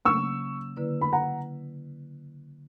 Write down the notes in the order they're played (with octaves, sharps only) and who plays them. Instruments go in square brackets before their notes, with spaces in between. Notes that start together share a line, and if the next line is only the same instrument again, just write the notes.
[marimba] C#3 F#3 A#3 C#4 [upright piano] C#6 E6
[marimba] D3 A#3 E4 B4 D5
[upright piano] B5
F#5 A#5